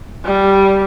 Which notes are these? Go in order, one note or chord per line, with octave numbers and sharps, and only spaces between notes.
G3